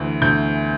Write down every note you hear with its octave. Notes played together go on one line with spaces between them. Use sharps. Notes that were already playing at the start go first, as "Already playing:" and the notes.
Already playing: D2 E3
D2 G6